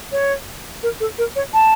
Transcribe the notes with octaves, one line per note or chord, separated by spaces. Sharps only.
C#5
A#4
A4
A#4
C#5
A5